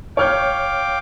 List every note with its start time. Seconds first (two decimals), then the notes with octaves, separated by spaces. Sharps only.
0.17 C#5 F5 G5 D6 F6 G6